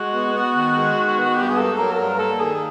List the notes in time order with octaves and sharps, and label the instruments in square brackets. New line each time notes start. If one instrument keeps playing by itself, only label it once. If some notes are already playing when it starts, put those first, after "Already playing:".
Already playing: [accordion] G#3 [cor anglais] F#4
[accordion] B3
B3
D#3
G#3
D#3
B3
[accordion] G2 [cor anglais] G4
[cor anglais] G#4
[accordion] A#3 [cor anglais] A4
[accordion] F#3 [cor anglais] A#4
[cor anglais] A4
[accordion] G2 [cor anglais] A#4
[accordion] A#3 [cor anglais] A4
[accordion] D#3 [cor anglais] G#4